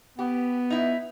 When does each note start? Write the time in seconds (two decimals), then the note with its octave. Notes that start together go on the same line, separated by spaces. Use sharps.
0.19 B3 G4
0.70 D#4 E4